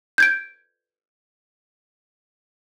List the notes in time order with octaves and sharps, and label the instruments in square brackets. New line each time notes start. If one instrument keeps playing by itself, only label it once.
[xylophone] G6 G#6 D7